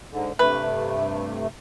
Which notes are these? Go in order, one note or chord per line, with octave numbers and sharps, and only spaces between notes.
G#2 D3
G2 C3 A3 B4